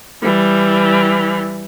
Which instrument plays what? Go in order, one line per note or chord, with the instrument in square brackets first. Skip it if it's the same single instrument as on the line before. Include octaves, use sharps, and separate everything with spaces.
[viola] E3 G3